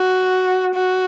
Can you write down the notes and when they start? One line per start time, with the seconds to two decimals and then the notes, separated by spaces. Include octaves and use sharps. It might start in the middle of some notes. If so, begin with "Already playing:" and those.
Already playing: F#4
0.75 F#4